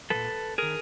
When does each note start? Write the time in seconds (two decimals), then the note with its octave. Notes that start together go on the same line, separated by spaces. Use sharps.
0.10 F3 A4 B4
0.14 A#2
0.58 D#3 G#4 A#4